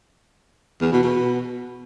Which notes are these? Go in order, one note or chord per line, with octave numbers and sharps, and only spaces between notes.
E2
B2
B2